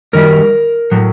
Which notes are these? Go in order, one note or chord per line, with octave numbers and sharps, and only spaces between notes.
F#2 D#3 G3 A#4
A2 F#3